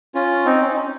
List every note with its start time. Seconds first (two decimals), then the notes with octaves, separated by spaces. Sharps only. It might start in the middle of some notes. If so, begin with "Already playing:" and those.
0.15 C#4 F4
0.45 C4 D#4
0.61 C#4
0.71 D#4
0.77 C#4